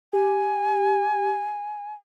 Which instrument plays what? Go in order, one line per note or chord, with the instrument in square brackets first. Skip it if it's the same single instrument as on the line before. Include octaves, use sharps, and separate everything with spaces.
[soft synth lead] G4 [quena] G#5